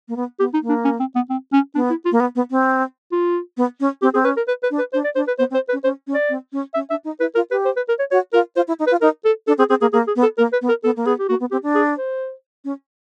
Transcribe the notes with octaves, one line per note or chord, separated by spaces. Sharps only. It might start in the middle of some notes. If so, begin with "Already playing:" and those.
A#3
B3
B3 G4
D#4
A#3
D4
C#4
C4
B3
C4
C#4
B3 D4
E4
F4
A#3
B3
B3
C4
F4
B3
C#4
C4 G4
C4 G#4
C#4 B4
A#4
B4
B4
D4
B4
D4 C5
D5
D4 C5
B4
B3 C5
C4
C5
B4
C#4
C#4 C5
C#4
D5
C4
C#4
C#4 E5
D4 E5
D#4
E4 B4
F4 A#4
G4 B4
C5
B4
A#4
C#5
F#4 C#5
F4 A#4
F4 C5
E4
D#4
B4
F4
D#4 A#4
A4
D4 A4
C4 G#4
C4 G#4
A#3 G#4
A#3 G#4
G#4
B3
A4
A#3 A#4
B4
B3
A#4
B3 A4
A#3
B3 G#4
G4
A#3 F#4
B3
C4 G4
D4
G#4
C5
C#4